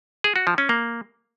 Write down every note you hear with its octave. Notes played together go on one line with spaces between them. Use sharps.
G#4
F#4
F3
C#4
A#3